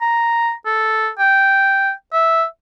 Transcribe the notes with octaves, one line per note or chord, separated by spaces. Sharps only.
A#5
A4
G5
E5